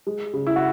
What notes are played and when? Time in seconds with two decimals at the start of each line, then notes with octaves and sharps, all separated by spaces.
0.07 G#3
0.33 C#3
0.47 E4
0.56 F#4